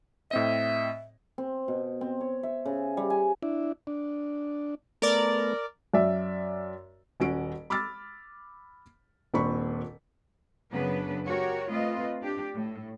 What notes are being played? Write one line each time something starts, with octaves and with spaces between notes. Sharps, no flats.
A2 C4 D#5 E5
C4
B2
C4
C#5
E5
C#3
G3
G#5
D4 E4
D4
A3 B3 A#4 D5
F#2 D5 E5
D#1 C#4 F#4 D7
B5 D6 E6 F6 A6
D#1 A#2 C4 D4 B5 C#6
F#2 C#3 B3 D4 B4
F#4 G4 A#4 C#5
A3 C4 F4 B4 D#5
D4 G4
A2